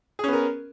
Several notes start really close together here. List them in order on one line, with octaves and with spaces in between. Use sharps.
G#4 C#4 B3 A#4